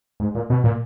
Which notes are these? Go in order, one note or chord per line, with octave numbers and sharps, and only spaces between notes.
G#2
A#2
B2
A#2